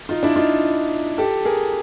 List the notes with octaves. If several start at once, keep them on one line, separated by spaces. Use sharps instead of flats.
D#4 F4
D4 E4
D#4 F4
G4 A4
G#4 A#4